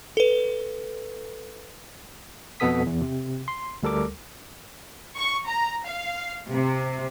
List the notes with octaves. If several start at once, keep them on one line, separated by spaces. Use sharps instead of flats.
A4 B4
F2 B2 B3 A4 D#6 B6
E2
C3
C6
D2 G3 A4 A#4 D6
C#6
A#5
F5
C3